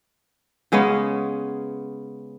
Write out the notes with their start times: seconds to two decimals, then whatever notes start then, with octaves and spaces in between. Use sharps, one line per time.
0.72 C#3 G#3 B3 C#4